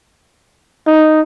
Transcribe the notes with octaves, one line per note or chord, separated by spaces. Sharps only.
D#4